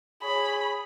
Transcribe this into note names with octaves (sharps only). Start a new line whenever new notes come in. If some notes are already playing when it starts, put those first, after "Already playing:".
G#4 C#5 B5